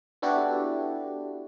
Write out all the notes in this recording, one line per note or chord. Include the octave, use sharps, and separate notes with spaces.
B3 D4 E4 F#4 G4 A4